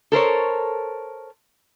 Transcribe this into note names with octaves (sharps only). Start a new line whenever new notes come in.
A4 A#4 C5 C#5